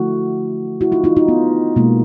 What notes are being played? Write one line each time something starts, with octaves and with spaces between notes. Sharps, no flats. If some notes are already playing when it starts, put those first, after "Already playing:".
Already playing: D3 F3 A3 E4 F#4
E4 F#4
D#4 F4
D#4 F4
D#4 F4
B3
B2 G#3 A#3